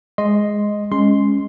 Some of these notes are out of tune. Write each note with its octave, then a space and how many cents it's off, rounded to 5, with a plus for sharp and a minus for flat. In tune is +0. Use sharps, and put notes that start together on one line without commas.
G#3 +0 D#5 +0 C6 +0
G#3 -5 C#4 +0 C6 +0